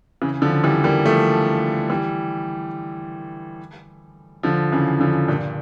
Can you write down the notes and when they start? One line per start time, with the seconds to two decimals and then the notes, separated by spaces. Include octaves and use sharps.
0.22 C#3 E3
0.41 D3 F3
0.63 E3 G3
0.84 G3 A#3
1.05 F3 A3
1.90 E3 G3
4.43 D3 F3
4.72 C#3 E3
5.00 D3 F3
5.28 G2 A#2